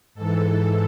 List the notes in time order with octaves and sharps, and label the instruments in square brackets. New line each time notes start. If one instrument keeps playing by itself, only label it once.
[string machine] G#2 E3 A4